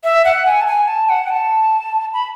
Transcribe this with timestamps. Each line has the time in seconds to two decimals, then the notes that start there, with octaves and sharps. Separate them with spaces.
0.04 E5
0.25 F#5
0.46 G#5
0.61 A5
0.66 G#5
0.88 A5
1.09 F#5
1.30 A5
2.13 B5